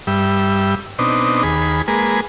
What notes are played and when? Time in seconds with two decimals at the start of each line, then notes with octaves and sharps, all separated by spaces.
0.07 G2 G3 E5
0.98 B2 C4 D4 D#4
1.43 D#2 G#4 B5
1.88 G#3 A#3 G#4 B4